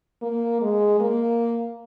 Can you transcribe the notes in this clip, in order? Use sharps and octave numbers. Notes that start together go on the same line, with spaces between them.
A#3
G#3
A#3